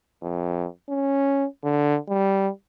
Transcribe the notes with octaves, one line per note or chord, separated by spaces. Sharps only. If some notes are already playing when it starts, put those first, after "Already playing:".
F2
C#4
D3
G3